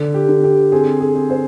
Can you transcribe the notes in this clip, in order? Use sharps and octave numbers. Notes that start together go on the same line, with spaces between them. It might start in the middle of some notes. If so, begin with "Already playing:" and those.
Already playing: D3
G4
D3
G4
C4 G#4
G#4
C4
C5